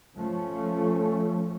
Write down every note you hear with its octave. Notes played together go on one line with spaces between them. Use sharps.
F3 A3 C#4